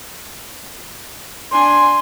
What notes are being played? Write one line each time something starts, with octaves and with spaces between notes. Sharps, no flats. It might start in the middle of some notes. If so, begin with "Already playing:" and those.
D4 G#5 C6